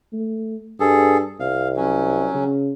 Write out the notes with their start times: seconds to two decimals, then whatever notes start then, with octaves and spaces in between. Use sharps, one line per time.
0.13 A3
0.80 G2 G#4 A4
1.40 C2 F5
1.76 F#3 C#4
2.34 C#3